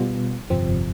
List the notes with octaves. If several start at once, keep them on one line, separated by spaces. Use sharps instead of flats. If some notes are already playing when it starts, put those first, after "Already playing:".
Already playing: B2 G3 B3 F4
G1 F2 C3 F3 C4